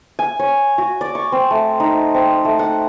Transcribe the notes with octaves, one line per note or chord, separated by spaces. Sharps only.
G#5
C#5
F#4
D5
C#6
C4
A3
D#4
C4
A3
F#5